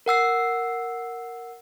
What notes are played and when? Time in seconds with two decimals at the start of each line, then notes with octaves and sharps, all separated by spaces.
0.06 A#4 F#5 E6 C7